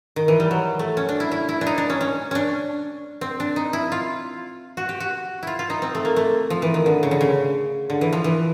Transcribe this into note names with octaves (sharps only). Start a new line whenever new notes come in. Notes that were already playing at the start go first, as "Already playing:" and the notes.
D#3
E3
G3
F#3
A3
C#4
D4
E4
E4
E4
D4
D#4
D4
C#4
C#4
C#4 D4
C4
D4
D#4
E4
F4
F#4
G4
F#4
E4 F4
F4
D#4
C4
A3
A#3
A3
F3
E3
D#3
D3
C#3
D3
C#3
D3
E3
F3
E3